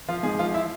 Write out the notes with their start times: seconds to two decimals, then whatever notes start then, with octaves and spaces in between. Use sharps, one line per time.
0.08 F3 F4
0.23 G#2 G#4
0.39 F3 F4
0.54 E4